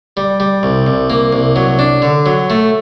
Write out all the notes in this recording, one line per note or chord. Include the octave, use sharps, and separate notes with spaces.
G3
G3
C2
C2
A#3
C2
F#3
D4
D3
F#3
A3